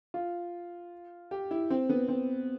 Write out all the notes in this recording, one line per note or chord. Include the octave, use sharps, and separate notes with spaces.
F4
G4
E4
C4
B3
C4